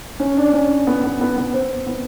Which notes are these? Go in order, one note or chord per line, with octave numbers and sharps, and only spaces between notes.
C#4
D4
C#4
B3
B3
B3
B3
C4
B3